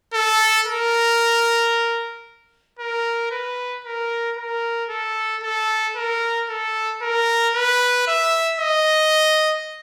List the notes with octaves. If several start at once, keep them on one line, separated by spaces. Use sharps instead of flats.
A4
A#4
A#4
B4
A#4
A#4
A4
A4
A#4
A4
A#4
B4
E5
D#5